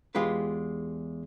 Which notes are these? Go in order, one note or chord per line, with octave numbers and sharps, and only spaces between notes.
E2 G#3 F4 G4 B4